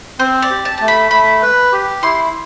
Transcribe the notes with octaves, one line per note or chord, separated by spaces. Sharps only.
C4 C5
D5
G4
A5
A3 A5
B5
A3 B5
B4
G4
E4 C6